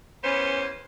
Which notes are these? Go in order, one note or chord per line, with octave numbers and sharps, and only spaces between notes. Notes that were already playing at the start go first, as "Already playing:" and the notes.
E2 B3 C#4 C5